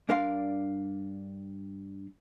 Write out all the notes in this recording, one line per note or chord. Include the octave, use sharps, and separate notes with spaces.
G2 D4 A#4 D5 F5 C6